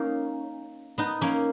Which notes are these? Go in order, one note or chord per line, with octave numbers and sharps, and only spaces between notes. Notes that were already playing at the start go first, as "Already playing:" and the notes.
Already playing: A#3 C#4 D#4
B3 D#4
A#3 C#4